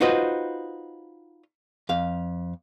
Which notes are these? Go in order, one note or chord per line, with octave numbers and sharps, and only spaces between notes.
D#4 F4 F#4 B4 C5 D#5
F2 F5